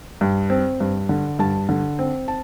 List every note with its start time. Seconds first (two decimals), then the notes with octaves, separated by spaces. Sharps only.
0.21 G2
0.50 C4
0.80 G2
1.09 D3
1.39 G2 A5
1.69 D3
1.99 C4
2.28 A5